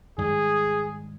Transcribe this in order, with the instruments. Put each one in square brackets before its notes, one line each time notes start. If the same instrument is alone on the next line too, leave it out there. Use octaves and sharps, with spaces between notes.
[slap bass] G#2 D#3 G3 [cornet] G#4